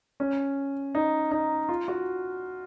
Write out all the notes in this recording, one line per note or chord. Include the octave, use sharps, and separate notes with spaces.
C#4
D#4
D#4
F4
F#4